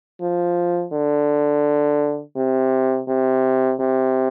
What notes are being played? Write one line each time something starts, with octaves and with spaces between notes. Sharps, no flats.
F3
D3
C3
C3
C3